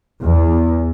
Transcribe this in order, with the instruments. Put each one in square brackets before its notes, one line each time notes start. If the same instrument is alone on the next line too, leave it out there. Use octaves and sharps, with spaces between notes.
[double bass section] E2